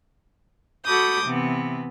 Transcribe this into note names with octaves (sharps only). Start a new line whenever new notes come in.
F#4 A4 B5 D6 D#6 G6
C3 E3 B3